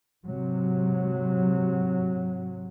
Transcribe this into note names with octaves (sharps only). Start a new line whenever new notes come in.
G#2 C3 F#3